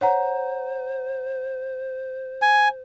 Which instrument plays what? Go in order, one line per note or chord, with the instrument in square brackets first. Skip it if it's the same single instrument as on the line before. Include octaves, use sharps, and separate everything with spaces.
[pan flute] C5 [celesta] C#5 F#5 A#5
[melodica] G#5